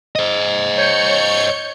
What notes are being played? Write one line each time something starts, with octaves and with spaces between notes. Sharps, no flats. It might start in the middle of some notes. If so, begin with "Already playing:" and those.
C5 D#5
C#5 G6 C#7